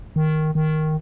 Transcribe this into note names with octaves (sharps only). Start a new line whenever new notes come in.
D#3
D#3